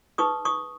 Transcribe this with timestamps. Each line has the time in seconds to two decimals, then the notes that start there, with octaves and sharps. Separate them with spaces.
0.18 D#4 G#4 B4 C#6 D#6
0.45 C#6 D#6